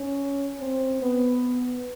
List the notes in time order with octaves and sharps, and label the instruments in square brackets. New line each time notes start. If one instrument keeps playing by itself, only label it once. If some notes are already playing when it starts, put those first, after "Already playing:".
Already playing: [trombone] C#4
C4
B3